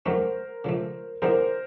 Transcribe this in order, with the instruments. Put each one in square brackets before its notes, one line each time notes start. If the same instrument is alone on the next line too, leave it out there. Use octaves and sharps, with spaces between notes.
[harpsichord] D#3 F#3 A3 C#4 [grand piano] A#4 C5
[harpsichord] C#3 F3 A3
[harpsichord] D#3 G3 B3 E4 G#4 [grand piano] A#4 C5